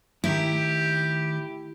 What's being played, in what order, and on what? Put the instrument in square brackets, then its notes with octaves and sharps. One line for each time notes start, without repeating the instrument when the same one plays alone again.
[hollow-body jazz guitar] A2 D#3 [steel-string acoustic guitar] E4 [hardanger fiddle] G4